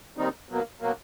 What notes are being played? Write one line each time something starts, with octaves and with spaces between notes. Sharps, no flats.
D#2 D#3 G3 C4 D#4
B2 F#3 A#3
B2 F#3 A#3